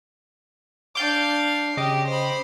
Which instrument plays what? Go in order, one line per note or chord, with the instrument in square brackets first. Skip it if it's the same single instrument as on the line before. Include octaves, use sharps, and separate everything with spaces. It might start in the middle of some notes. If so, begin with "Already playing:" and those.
[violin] D4 F5 [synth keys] D6 G6 A6
[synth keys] C#3 D#5 D6 [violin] G4
[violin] C5 B5